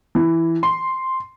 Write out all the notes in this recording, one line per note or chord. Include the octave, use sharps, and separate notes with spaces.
E3
C6